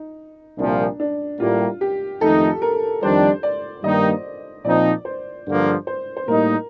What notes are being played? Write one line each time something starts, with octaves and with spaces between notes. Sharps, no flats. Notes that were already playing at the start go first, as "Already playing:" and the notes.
Already playing: D#4
C2 A#2 F3 D4
D4
A2 G3 A#3 F4
G4
F2 D#3 A3 D#4 A4
A#4
F2 D#3 G3 D4 C5
D5
G2 D#3 G3 A#3 D#4 D#5
A#2 F3 C4 D#4 D5
C5
G2 D3 F3 A#3
C5
C5
A2 G3 A#3 D#4 A#4